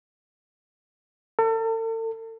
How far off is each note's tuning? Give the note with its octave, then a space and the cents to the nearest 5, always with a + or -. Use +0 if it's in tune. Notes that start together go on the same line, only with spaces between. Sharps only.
A4 +40